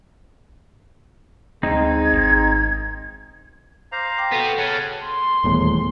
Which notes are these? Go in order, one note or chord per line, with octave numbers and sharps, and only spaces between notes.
D2 G#3 C4 D#4 G#6
G#1
C5 F5 A#5 D6
G5 D6
B3 F#4 A4 G5
C#3 C#4 C#5 F#5 A5
C6
D#1 E2 A2